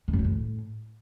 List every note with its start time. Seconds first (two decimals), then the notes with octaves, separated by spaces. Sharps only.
0.08 D#3
0.13 F#2
0.19 D3
0.24 A2